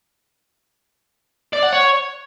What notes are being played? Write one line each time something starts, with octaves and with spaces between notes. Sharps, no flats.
D5
F#5
C#5